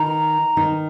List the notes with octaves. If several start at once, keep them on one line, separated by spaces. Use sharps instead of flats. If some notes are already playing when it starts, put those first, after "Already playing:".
Already playing: D#3 D#4 A#5
D#3 D#4